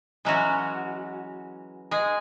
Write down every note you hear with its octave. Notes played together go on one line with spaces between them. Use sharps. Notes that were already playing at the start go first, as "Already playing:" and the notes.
E3 F#3 G#3 C#4 F#4
G#3 G#4